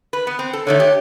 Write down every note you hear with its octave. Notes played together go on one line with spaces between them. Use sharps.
B4
B3
C4
A4
D3 D#3 A3 C#5
G4